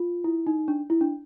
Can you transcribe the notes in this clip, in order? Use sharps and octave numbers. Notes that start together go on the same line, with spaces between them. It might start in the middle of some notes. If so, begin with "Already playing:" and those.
Already playing: F4
E4
D#4
D4
E4
D4